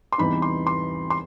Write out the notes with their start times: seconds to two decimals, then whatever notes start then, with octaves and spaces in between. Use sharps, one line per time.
0.12 C6
0.18 E2 C3 E3 G3 D#4 B5
0.42 C6
0.67 C6
1.10 C6